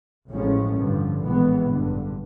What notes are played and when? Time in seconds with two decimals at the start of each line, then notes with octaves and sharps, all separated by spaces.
0.30 A1 A2 F3 G#3 C#4
0.76 G2 D3 F3
1.22 A#1 A2 E3 G#3 B3
1.67 A1 G2 D3